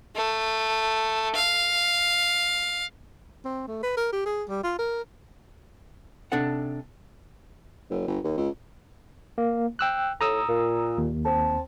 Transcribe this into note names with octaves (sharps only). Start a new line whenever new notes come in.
A3
F5
C4
A3
B4
A#4
G4
G#4
G3
F4
A#4
C3 D4 D#4 A4 F#5
F#1
G1
D#2
C#2
A#3
G5 E6 F#6
A2 A#5 D#6 E6
A#2
D#2
C4 A5